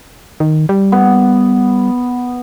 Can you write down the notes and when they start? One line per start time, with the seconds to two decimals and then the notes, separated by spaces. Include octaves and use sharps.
0.40 D#3
0.69 G3
0.92 B3